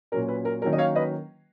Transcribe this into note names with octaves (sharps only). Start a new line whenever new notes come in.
A#2 F#3 C#4 A#4
B4
A#4
D#3 F#3 A#3 C#4 A#4
D#5
C#5 F5
B4 D#5